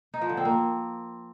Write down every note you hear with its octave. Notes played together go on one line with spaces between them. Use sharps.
D#4
F3
D3
C4
A#3